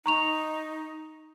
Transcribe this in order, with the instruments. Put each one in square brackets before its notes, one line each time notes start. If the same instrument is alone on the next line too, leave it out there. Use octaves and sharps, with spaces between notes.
[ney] D#4 [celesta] A#5 C#6 F7